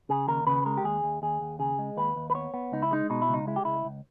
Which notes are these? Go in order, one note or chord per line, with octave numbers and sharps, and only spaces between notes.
C#3 G#4
D#2 A#4
C#3 B4
G#3 A#4
G4
D#2 G#4
D#2
D#2 G#4
D#2
C#3 G#4
G#3
D#2 B4
D#2
B4
B3 C#5
B3
C#2 D#4
E4
G#3 D#4
B2 D#4
E4
C#2 D#4
G#3 E4
G4
C#2 E4
C#2